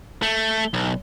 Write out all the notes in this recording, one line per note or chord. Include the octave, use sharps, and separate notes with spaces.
A3
B1